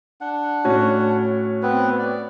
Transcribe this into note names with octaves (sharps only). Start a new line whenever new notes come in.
D4 F#5
A2 C#4 F#4
B3 C4 B4
D5